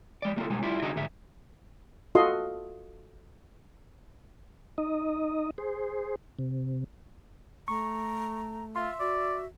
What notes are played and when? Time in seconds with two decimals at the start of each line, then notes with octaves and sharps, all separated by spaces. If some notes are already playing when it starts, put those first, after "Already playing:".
0.22 G#3 D5
0.36 G3 A#3 D#4 F4 A4
0.50 B2 G3 G#3 G#5
0.62 G3 E4 F4 D5
0.82 C2 D3 D#4 F#4 G#4 D#5
0.96 D2 G#2 G#4 E5
2.15 F4 F#4 A4 D#5 C6
4.78 D#4 D#5
5.58 G#4 C5
6.39 C3
7.68 A3 A#5 C#6
8.76 F4 E5 C6
9.00 F#4 D5